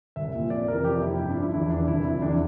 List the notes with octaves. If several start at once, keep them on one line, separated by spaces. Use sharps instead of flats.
C2 E5
A#2 F3
F2 D5
C3 E3 A#4
F2 G4
C3 F3 E4
G2 E4
D4
F3
E4
E2 E4
E3 D4
C2 E4
C3 F3 E4
E2 D4